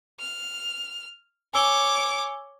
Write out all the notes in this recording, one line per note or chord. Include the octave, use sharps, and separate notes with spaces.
F6
C#5 G#5 D6 E6 G7